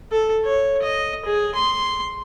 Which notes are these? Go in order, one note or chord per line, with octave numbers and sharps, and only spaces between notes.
A4
C#5
D#5
G#4
C6